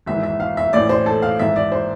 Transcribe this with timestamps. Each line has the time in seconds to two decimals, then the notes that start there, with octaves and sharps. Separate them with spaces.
0.06 G#1 G#2 E3 E5
0.23 E5
0.40 F5
0.57 E5
0.73 A1 A2 E3 D5
0.89 C5
1.06 A4
1.22 F5
1.39 G#1 G#2 E3 E5
1.56 D5
1.72 C5